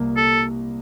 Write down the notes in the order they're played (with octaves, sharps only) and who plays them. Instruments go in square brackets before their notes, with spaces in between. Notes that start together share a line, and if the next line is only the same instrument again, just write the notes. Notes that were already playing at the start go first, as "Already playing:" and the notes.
Already playing: [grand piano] C2 A#3
[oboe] A4